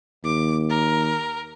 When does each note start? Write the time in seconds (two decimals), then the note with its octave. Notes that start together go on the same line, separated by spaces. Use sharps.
0.25 D#2 D6
0.69 A#4